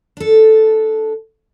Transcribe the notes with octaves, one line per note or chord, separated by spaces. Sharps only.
D4 A4